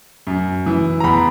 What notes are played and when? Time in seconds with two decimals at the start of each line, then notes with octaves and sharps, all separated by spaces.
0.27 F#2
0.66 E3
1.00 A#5
1.04 E2 B5